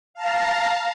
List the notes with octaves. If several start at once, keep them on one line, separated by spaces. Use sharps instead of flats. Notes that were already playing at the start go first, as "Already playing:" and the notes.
F5 A5 A#5